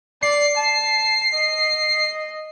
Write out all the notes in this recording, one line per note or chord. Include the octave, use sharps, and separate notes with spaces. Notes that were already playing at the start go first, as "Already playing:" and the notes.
D5 C7
A5
D#5